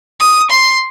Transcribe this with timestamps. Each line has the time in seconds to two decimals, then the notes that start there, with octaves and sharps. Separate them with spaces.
0.20 D#6
0.51 C6